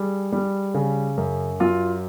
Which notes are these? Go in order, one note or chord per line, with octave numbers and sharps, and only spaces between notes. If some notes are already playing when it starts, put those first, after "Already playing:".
Already playing: G3 G#4
G3
C#3
F#2
F#3 F4